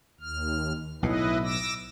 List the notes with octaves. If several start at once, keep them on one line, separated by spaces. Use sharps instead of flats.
D#2 F6
B1 A2 E4 B4 D#5
D6 E6 A#6